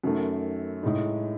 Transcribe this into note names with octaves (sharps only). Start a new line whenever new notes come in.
F#2 D#3 A3
A2 G#3 D#4